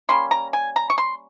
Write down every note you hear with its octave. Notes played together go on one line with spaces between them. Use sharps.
G3 A#3 C#4 C6
A#5
G#5
A#5
C#6
C6